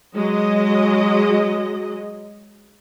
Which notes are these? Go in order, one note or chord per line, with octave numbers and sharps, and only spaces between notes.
F#3 G#3 D#5